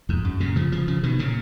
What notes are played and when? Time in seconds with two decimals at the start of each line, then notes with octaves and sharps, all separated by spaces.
0.09 F2 G#2
0.25 F#2
0.40 A#2 C#3
0.56 C#3 F3
0.72 C#3 F3
0.88 C#3 F3
1.03 B2 D#3
1.19 A#2 C#3